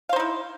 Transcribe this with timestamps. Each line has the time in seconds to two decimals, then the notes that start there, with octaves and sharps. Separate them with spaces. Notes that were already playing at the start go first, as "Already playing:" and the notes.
0.09 F5
0.13 C5
0.16 D#4
0.20 E4